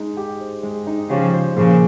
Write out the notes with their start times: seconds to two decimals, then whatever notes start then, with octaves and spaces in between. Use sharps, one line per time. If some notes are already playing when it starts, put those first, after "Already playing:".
Already playing: G#3 D#4
0.17 G4
0.40 C5
0.63 G#3
0.87 D#4
1.09 C#3 F3 G4
1.34 C5
1.56 A#2 C#3 F3